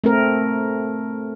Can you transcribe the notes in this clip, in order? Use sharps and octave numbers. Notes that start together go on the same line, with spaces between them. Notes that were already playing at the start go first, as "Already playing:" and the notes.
A3 C4 A#4